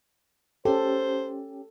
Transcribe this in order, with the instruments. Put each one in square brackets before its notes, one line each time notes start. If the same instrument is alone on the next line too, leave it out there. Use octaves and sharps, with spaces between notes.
[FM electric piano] C#4 G4 [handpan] A4 [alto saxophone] C5